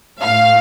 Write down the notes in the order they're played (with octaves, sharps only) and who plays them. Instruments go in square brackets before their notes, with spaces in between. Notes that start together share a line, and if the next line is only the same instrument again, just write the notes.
[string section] A2 F5